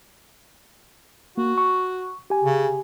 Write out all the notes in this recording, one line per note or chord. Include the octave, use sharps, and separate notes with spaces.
A#3 F#4
C#6
G4 G#5
C#3